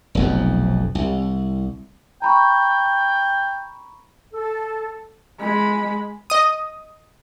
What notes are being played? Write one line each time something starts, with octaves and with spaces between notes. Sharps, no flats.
F1 B1 F2
C2
G5 A#5 B5 C#6
A4
G#3 B5
D#5 D#6